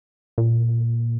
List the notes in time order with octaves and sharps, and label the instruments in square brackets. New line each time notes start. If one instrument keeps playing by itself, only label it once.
[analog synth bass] A#2